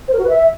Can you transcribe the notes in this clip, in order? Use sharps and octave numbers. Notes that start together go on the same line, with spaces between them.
C5
A#4
F#4
B4
E5